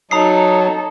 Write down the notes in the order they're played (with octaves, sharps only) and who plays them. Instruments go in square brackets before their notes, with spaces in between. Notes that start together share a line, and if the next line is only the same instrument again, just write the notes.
[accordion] F#3 [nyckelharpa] D#4 [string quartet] A4 [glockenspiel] A#5 D#6 C7